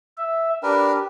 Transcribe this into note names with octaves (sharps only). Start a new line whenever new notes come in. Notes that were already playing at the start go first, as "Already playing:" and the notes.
E5
D4 G4 A#4 B4